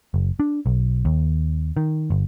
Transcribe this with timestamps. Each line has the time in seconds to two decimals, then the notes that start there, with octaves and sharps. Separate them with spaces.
0.14 F#1
0.40 D4
0.66 B1
1.05 D#2
1.77 D#3
2.10 G1